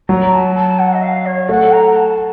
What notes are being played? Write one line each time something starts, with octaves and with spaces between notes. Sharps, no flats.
F#3 A#5
A5
A5
F#5
D#5
F5
C#5
A3 F#5
A#5
A#5
A5